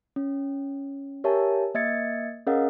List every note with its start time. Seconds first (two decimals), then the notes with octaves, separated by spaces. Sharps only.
0.16 C#4
1.24 G4 A#4 C#5 E5 G#5 A5
1.74 A#3 D#5 E5 G#6 A6 C#7
2.47 C#4 G#4 A#4 D#5 F5 F#5